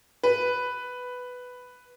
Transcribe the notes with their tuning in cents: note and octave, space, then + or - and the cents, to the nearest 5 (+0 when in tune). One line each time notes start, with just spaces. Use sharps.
B4 +5